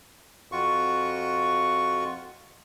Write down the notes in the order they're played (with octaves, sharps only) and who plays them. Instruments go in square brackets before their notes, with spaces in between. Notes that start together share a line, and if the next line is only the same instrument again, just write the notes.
[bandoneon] F2 F4 F#4 C#6